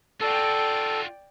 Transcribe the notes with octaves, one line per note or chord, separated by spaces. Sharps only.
F4 F#4 A4 D5 G5